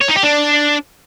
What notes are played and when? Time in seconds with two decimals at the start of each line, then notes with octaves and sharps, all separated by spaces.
0.01 C#5
0.09 D#4
0.16 G4
0.24 D4